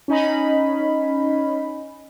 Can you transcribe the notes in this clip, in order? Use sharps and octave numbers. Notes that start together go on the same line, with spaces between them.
C#4 D#4 D#5 B5